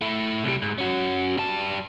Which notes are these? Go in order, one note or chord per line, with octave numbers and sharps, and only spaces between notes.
A3 E4
C2 G3
G#2
C#4 F#4
G3 A5